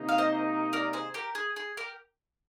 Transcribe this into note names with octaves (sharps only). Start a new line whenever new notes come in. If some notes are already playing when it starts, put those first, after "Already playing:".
Already playing: C3 D#3 A#3 D#4
F5
C5 D#5
A#4 D5
G#4 C5
G4 A#4
G#4
G#4
G4 A#4